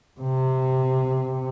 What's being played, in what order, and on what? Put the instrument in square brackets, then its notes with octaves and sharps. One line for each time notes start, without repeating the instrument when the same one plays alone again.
[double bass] C3